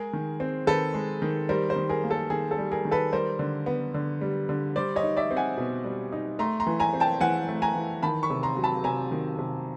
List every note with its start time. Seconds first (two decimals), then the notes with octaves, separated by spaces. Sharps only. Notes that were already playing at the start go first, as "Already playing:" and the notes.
Already playing: G#3 G#4 A#4
0.13 D#3
0.40 C4
0.67 D#3 A4 B4
0.94 G#3
1.22 D#3
1.49 G3 A#4 C5
1.69 A#4 C5
1.76 D#3
1.89 G#4 A#4
2.04 A#3
2.11 A4
2.30 D#3 G#4
2.51 A4
2.58 G3
2.71 G#4 A#4
2.85 D#3
2.91 A4 B4
3.12 G3 A#4 C5
3.39 D3
3.66 B3
3.94 D3
4.21 G3
4.49 D3
4.76 G3 C5 D5
4.96 C#5 D#5
5.03 D#4
5.17 D5 E5
5.31 C4
5.37 F#5 G#5
5.58 B2
5.85 G3
6.12 D#4
6.39 A3 A#5 C6
6.60 A#5 C6
6.67 E3
6.80 G#5 A#5
6.93 C4
7.00 G5 A5
7.21 E3 F#5 G#5
7.48 A3
7.62 G#5 A#5
7.75 E3
8.03 D#3 A5 B5
8.23 B5 C#6
8.30 C3
8.43 A#5 C6
8.57 F#3
8.64 A5 B5
8.84 C3 G#5 A#5
9.12 D#3
9.39 C3